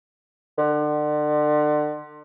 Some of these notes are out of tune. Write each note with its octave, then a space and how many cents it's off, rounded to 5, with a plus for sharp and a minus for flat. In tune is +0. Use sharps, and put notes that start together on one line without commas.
D3 +35